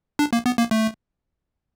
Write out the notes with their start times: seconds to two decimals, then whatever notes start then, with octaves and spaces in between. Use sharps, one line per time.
0.19 D4
0.33 A#3
0.46 B3
0.58 A#3
0.71 A3